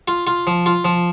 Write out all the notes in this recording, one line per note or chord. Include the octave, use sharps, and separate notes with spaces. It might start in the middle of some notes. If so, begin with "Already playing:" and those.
F4
F4
F3
F4
F3